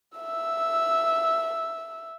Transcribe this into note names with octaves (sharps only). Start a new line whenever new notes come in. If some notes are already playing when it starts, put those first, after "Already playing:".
E5 E6